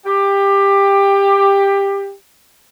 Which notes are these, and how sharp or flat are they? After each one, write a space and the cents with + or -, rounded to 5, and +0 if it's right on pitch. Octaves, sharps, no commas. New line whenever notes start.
G4 +15